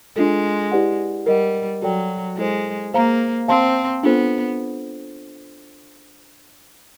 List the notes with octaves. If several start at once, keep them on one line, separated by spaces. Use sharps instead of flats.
G#3 D4 F4 A4
E4 G4 B4 D5 F#5
G3 A#4 D#5 F#5
F#3 F#4 A4 D5 G5
G#3 E4 A4 C5
A#3 G#4 C5 F5 A#5
C4 C5 F5 A5 C6
B3 D4 F4 A4 C5